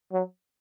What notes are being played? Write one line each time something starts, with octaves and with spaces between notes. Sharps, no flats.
F#3